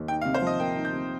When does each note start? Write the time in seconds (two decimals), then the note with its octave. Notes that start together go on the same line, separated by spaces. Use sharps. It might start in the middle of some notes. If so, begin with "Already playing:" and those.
Already playing: D#2
0.08 D#4 G5
0.21 F5
0.25 C3
0.34 C5
0.42 F3 D#5
0.60 A#3 G5
0.76 D#4
0.85 G6
0.93 C3